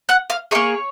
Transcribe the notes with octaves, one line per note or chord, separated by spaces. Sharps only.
F#5 F#6
F5 F6
A#3 D#4 G#4 C#5 C#6